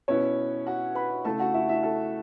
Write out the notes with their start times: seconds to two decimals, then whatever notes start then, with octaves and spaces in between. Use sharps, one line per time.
0.08 B2 B3 C#4 E4 C#5
0.67 F#4 F#5
0.95 B4 B5
1.25 C#3 A3 E4 A4 A5
1.40 F#4 F#5
1.54 E4 E5
1.69 E4 E5
1.83 A4 A5